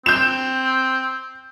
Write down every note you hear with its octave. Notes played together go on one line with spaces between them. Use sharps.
C4 G6 E7